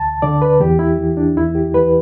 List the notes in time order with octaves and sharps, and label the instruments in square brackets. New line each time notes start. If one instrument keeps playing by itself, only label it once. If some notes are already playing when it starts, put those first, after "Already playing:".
Already playing: [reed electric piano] D2 A5
D3 D5
B4
E2 G4
E4
E3
D4
E2 E4
G4
E3 B4